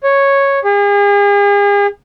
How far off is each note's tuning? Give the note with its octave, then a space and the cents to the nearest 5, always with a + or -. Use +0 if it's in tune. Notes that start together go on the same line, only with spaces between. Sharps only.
C#5 -5
G#4 -40